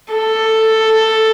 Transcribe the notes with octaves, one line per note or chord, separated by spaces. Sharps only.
A4